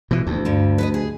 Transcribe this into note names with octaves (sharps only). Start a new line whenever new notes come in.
B2 E3
D2
G2 D3
B4 C#5 D#5
G#4